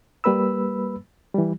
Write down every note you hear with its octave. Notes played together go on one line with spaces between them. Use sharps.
G3 A#3 B4 B5 E6
E3 G3